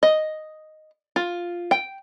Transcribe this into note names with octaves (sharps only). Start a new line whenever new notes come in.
D#5
F4
G5